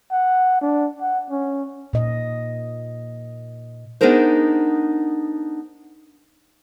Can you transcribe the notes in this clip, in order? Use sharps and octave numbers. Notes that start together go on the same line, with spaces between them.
F#5
D4
F#5
C#4
A#2 D#5
B3 D4 D#4 G#4 A#4 C5